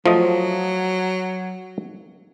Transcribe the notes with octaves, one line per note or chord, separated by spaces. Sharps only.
F3 F#3 A3 D#5